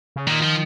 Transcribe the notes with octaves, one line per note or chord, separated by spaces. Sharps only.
C#3
A#2 D#3
F3